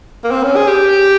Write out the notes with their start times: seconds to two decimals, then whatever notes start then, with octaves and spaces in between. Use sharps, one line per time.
0.24 A#3
0.31 C4
0.44 C#4
0.56 G#4
0.68 G4